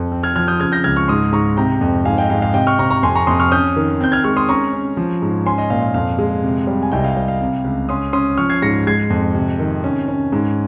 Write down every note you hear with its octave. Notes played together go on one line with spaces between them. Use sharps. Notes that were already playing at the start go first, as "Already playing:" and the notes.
Already playing: F2
C4
F6 G#6
F3 F6 G#6
D#6 G6
C#3 F6 G#6
G6 A#6
C#2 F6 G#6
C#6 F6
G#2 C6 D#6
G#2 A#5 C#6
C3 G5 A#5
F2
G#2 F5 G#5
D#5 G5
G#2 F5
F5
C3 D#5 G5
C#6 F6
C3 A#5 C#6
A#5 C#6
F2 G#5 C6
A#5 C#6
F2 C6 D#6
C#6 F6
C#4 D#6 G6
D#3
C4 G6
F6 G#6
G#3 C#6 F6
C6 D#6
C#4 A#5 C#6
C#4
F3
G#2
C#4 G#5 C6
D#5
A#2 F5
F5
F2 F5
G#3
C3
G3
G#5
C2 D#5 G5
F5
G3 D#5
F5
C3
C#2
C#4 C6 D#6
C#4 C6 D#6
F3 C#6 F6
G#6 C7
G#2 A#6 C#7
G#3 G#6 C7
F2
C3
D#3
C#4
C#4
G#2